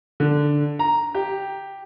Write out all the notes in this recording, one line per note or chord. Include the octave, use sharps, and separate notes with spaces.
D3
A#5
G4